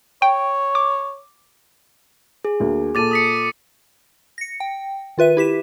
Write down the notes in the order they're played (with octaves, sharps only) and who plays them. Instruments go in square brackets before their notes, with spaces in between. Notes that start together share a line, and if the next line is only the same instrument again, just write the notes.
[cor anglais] C#5 [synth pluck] G5
[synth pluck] D6
[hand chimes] G#4
[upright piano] D2 A#3
[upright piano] A#2 A4 [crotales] D6 A6 D#7
[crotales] D#6 B6 C#7
[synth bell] A#6 C#7
G5
D#3 F4 B4 E5 D#7
E4 G4 B6 E7